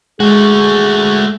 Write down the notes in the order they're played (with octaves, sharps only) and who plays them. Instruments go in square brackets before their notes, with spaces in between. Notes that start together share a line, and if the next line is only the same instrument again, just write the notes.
[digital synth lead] G#3 [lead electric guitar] A3 F#4 [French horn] G#4